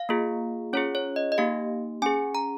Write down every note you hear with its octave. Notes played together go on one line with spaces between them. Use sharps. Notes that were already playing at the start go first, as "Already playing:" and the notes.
Already playing: F5
A#3 F4 G#4
C#4 F4 G#4 C#5
C#5
D#5
D#5
A#3 D#4 G4 F5
C#4 G#4 G#5
A#5